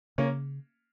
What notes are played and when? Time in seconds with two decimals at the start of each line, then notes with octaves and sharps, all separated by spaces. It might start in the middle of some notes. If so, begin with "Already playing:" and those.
0.18 C#3 A#3 C#4